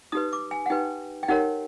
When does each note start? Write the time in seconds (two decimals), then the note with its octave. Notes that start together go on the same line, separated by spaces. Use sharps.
0.12 D#4 G4 B4 D#6
0.33 D6
0.51 G#5
0.66 F#5
0.70 D#4 G4 B4 G5
1.23 G5
1.28 D#4 G4 A#4 C#5 F#5